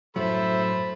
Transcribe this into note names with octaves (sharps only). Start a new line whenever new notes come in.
F#2 A2 F#3 A4 C5 E5 B5